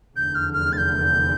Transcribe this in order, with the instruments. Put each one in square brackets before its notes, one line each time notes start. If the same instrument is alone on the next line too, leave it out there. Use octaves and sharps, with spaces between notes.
[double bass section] F1 E2 D3 [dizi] G6
[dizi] F6
F6
A6
G6